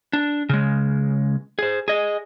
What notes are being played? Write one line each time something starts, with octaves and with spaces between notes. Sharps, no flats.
D4
C#3 G#3
G#4 C5
G#4 D#5